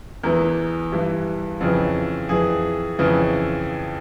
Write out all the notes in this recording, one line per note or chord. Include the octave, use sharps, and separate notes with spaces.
E2 E3 A#4
G2 E3
F2 C#3 E3
F2 E3 G#4
F2 C#3 E3